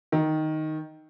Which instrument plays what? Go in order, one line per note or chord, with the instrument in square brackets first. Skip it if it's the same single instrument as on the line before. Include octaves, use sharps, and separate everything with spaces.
[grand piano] D#3